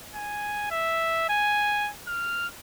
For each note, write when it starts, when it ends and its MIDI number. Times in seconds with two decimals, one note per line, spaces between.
0.15 0.69 80
0.71 1.24 76
1.30 1.91 80
2.08 2.47 89